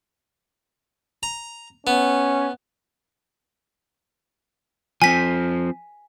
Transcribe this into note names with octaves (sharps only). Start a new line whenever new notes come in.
A#5
B3 C#4
F3 C4 G#5 B6